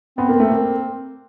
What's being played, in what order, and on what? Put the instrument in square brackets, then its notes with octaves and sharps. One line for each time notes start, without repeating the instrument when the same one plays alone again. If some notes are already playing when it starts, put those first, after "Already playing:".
[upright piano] B3 [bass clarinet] C4
[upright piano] A#3
A3
A#3